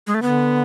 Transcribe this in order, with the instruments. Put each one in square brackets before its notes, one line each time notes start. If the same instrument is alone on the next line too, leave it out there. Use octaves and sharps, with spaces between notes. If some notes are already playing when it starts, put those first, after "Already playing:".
[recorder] G#3
A3
[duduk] D3 [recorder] B3